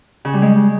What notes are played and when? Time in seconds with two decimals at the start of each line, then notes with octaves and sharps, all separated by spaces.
0.25 C#3
0.33 G3
0.42 G#3